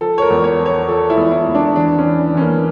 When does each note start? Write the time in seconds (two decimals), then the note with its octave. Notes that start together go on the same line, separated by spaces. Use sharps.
0.01 F3 A4
0.18 C#5
0.22 A#4
0.30 E2
0.44 C#5
0.59 F3
0.66 C#5
0.88 F3 A4
1.10 E4
1.17 E2
1.31 E4
1.47 E2
1.55 D4
1.76 E3 D4
1.98 C#4
2.05 E3
2.35 E3 C#4
2.41 A#3